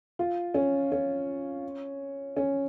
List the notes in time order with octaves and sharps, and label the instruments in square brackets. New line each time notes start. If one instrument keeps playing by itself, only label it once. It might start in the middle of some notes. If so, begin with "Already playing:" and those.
[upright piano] F4
C#4
C#4
C#4